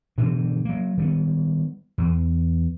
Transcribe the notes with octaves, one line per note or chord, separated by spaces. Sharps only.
G2 B2 D3 E3
F#3 A#3
D#3 G3 A3 B3
E2